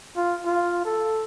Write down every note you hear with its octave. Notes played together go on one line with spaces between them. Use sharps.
F4
F4
A4